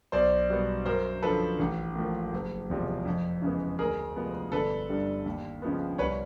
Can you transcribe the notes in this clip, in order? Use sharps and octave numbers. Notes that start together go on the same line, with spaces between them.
B1 C5 D5
B2 G3 B3
F#2 A#4 C5
D3 F3 A4 B4
A1
A2 F3 A#3
F#1
E2 C3 F3 G#3
F2
C#3 E3 G#3 B3
D2 G#4 A#4
C3 F3 G#3 B3
G1 A4 B4
G2 D3 G3
D#2
C#3 F3 G#3 B3
C2 B4 C#5